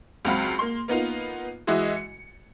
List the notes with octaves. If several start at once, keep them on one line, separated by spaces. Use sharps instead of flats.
C#2 F#3 C4 F#4 F5 B5
A#3 C6
A#3 B3 D#4 F4
E3 G#3 E4 F#4 D#5
C#7